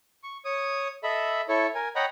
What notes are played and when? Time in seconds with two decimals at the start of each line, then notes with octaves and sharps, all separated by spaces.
0.23 C#6
0.45 C#5 D#6
1.03 A4 D#5 E5 B5
1.49 E4 A4 C#5
1.75 A#4 G#5
1.95 C#5 D#5 F#5 G5 A#5 B5